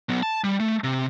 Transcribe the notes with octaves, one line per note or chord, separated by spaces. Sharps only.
F#3 B3
A5
G3
A3
C3